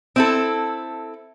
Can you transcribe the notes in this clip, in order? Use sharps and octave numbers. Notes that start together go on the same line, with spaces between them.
C4 E4 A4